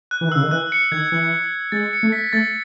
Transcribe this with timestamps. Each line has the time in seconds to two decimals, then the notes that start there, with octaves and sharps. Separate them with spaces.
0.11 F#6
0.21 E3
0.28 D#3
0.32 C#3 E6
0.43 D#3
0.51 E3 F#6
0.72 C#7
0.92 D#3 G#6
1.12 E3
1.72 G#3 A6
1.93 C#7
2.03 A3
2.12 B6
2.33 A3 A6